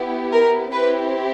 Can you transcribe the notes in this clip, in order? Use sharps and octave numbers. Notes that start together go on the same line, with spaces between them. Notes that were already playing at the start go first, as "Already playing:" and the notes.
Already playing: B3 E4 G4
A#4
C4 E4 G4 B4